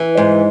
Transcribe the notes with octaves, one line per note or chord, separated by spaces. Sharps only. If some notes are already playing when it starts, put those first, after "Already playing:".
Already playing: E3
G#2